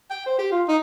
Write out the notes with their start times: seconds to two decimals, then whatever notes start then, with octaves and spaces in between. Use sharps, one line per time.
0.11 G5
0.26 C5
0.39 G4
0.52 F4
0.68 D#4